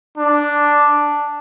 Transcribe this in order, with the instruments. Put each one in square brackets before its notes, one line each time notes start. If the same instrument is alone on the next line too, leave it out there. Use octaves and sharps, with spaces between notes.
[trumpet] D4